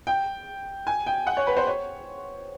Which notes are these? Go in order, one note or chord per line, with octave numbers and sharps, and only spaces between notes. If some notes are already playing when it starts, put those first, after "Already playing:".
G5
G#5
G5
F#5
C#5
B4
C5
C#5